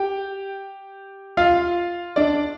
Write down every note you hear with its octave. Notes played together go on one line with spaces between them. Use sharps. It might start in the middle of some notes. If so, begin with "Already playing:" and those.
Already playing: G4 G5
F4 F5
D4 D5